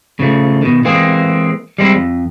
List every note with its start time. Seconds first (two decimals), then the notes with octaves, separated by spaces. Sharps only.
0.20 C#3 F3 A3
0.62 B2 D#3
0.85 E3 G#3 A#3 C4 G#4
1.78 G3 G#3 C4 E4
1.95 F2